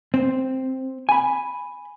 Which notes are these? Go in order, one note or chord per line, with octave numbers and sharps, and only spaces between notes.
C4
G#5 B5